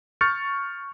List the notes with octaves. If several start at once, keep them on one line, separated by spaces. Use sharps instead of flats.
C#6 F6 G6 A6 C#7